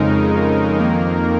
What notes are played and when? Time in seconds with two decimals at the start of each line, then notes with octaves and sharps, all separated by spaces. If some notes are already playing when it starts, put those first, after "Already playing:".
Already playing: F2 C#3 G#3 D#4 A#4
0.79 F2 D#3 A#3